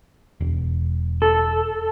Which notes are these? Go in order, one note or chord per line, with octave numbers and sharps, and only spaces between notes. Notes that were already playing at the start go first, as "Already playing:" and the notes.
E1
A4